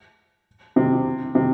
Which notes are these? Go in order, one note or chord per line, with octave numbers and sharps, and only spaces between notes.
C3
C3